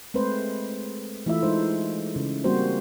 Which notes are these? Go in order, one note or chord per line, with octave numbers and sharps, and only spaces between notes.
G#3 A3 C4 B4 C5
E3 A3 E4 F4 E5
G#3 D#4 C5
C#3
G3 A#3 C4 F#4 C5